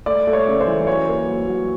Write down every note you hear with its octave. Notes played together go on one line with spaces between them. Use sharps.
A3 D5
A3
C#5
C#3
C5
E3
F#3 C#5
A#3
F#3
F#3